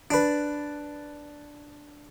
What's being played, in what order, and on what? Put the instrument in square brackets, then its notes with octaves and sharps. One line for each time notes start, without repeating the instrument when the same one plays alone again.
[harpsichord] D4 B4